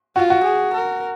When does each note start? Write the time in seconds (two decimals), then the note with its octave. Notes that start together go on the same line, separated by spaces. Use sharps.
0.16 F4 F#4
0.30 F#4
0.44 G#4
0.73 A#4